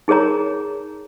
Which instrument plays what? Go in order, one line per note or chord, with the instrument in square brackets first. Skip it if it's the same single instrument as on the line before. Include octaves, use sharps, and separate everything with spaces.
[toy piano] D#4 G#4 A#4 C#5 A#5